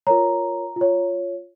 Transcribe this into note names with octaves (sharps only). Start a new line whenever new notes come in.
F4 A#4 C#5 A#5
F4 C#5